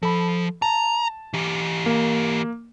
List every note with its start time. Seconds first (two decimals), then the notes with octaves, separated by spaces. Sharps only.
0.03 F3 A4 B5
0.62 A5 A#5
1.34 E3 G4
1.86 A#3